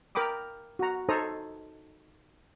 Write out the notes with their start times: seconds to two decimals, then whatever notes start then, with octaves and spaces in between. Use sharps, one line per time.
0.15 A#4 G5 B5 D6 D#6
0.79 F#4 A#5
1.09 D#4 A4 C5 C#5 A#5 D#6